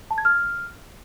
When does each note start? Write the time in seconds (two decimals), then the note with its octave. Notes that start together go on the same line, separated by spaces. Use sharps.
0.11 A5
0.18 G#6
0.25 F6